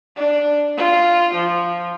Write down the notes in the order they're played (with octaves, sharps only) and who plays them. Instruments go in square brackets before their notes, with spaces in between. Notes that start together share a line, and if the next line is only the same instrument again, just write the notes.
[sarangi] D4
F4
F3